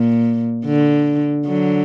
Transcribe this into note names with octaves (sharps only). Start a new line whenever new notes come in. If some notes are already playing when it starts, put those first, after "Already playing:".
Already playing: A#2
D3
D3 F#3